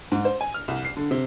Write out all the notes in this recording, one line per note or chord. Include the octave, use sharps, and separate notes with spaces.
G#2
C5
G#5
F6
C2
C7
D3
C3